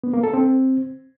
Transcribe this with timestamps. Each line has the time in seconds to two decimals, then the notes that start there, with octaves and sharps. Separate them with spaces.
0.04 B3
0.14 A#3
0.23 A4
0.33 C4